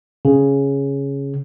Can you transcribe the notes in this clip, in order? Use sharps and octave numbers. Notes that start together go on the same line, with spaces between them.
C#3